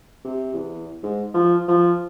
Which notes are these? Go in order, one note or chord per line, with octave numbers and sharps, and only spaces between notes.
C3
E2
G#2
F3
F3